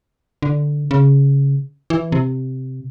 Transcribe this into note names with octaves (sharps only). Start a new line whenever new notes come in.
D3
C#3
E3
C3